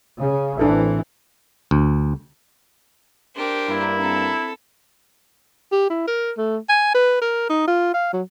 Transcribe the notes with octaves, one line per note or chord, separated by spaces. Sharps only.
C#3
A1 E3 C4 D4 A4 E5
D2
D4 G4 A#4 C5
G2 A#3 E4 A#5
C4 A4
G4
E4
A#4
A3
G#5
B4
A#4
D#4
F4
F5
F#3